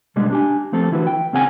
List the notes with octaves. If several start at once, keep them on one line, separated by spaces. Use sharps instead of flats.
B2 D3 G3 G#3 B3
D4 G4 G#5
F3 A3 C4 G4 A4
D3 E3 E4 F#4 A#4 B4
G5
C#2 C4 C#4 G#4 F#5 G#5